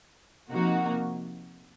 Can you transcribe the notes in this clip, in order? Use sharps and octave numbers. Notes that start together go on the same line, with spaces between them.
C3 F3 A#3 D#4 F#4